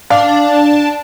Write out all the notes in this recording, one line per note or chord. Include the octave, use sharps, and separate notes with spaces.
D4 F5